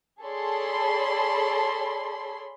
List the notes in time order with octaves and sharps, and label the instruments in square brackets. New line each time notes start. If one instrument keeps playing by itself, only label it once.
[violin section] G#4 A4 C#5 D5 B5 C6